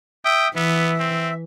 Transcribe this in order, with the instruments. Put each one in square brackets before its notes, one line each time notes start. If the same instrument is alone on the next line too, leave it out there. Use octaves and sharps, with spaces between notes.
[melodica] E5 D#6 [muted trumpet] G5
[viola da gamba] E3 [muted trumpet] B3 [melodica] E5
[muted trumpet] C4